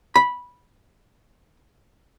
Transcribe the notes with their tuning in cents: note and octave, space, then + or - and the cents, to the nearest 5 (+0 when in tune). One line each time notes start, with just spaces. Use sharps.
B5 -10